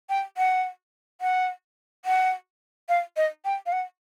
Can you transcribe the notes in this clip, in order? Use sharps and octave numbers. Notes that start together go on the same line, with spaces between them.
G5
F#5
F#5
F#5
F5
D#5
G5
F5
F#5